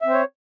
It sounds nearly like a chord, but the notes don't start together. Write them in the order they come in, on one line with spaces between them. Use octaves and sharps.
E5 C4 C5 C#5